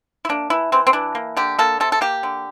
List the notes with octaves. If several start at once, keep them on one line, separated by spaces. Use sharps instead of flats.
E4
A#3 D4
E3 E4
E3 C4
C4
E3 D4
A#3
D3 G4
A#3 A4
C3 A4
A4
A#3 G4
D3